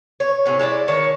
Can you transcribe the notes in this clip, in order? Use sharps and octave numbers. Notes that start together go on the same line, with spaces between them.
C#5
A2 C3 C#4
G#3 E4 F4 D5
D#3 C#5 A5